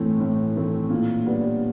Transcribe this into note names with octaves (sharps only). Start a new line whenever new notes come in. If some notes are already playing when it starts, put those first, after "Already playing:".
Already playing: A2 E3 A3 C4
A2
E3 A3 C4
A#2
G3 B3 D4